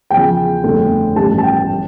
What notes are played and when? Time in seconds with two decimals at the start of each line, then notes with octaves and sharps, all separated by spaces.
0.10 E2 C#3 F3 G5
0.64 G1 F2 D3 A3
1.16 A1 G2 F3 A5
1.38 A5
1.43 G5
1.71 E3 G3